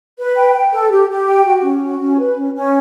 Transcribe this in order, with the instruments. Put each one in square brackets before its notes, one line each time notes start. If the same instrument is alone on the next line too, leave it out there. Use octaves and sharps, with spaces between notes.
[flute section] B4
G5
G5
A4
G4
G4
G5
F#4
C#4
F#4
C#4
B4
C#4
C#4